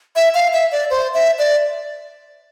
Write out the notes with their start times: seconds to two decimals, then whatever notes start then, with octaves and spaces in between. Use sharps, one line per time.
0.16 E5
0.35 F5
0.53 E5
0.72 D5
0.90 C5
1.14 E5
1.39 D5